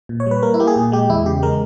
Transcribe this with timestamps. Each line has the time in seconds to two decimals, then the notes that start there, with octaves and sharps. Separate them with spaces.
0.09 A#2
0.20 C#5
0.26 G3 B4
0.42 A#3 A#4
0.54 E4
0.60 A#3 G4
0.67 G#4
0.76 A#2
0.92 G#3 G4
1.09 E2 E4
1.26 C#3 G4
1.42 G#3 A#4